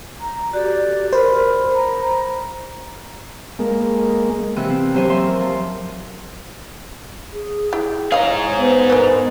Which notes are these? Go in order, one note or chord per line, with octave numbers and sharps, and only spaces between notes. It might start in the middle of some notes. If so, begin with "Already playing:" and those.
A#5
F#4 G4 A4 D5
A#4 C5 B5
A#5
G#3 A#3
C3 E3 F3 G5 F#6
C4
D#2 F#3 G4 C5 C#5 G#5
E5 C6
A#4
F3
G#4
E4 G4
D#4 E4 G#4 C#5 D#5 F5
G#2 B3 C5 G#5
A#4 B4